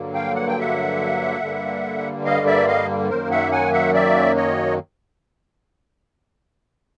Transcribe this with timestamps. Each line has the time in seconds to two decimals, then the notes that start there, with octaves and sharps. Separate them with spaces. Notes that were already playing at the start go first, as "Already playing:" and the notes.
Already playing: G2 D3 F#3 A#3
0.14 F5 G5
0.35 F#5
0.48 G5
0.59 E5 F#5
1.41 G2 D3 G3 A#3
2.25 D#5 F5
2.47 D5 E5
2.67 D#5 F5
3.10 F#2 D#3 F#3 A#3 A#4 C5
3.31 E5 F#5
3.51 F#5 G#5
3.73 E5 F#5
3.94 D5 E5
4.36 C#5 D#5